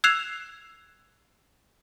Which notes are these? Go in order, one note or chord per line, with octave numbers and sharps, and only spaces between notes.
E6 F#6 G#6 C7 E7 F7